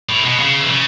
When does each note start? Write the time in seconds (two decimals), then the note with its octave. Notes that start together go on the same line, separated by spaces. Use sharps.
0.09 A2
0.24 B2
0.39 C#3
0.60 E3
0.70 C#3